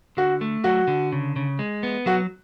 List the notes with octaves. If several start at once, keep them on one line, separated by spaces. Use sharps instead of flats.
D3 F#4
A3
F#3 F#4
D3
C#3
C#3
G#3
B3
F#3 F#4